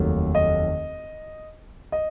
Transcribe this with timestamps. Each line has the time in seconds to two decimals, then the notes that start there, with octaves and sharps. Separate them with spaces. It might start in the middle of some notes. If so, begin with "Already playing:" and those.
Already playing: F1 D#2 D#3 F#3 A3
0.35 D#5
1.92 D#5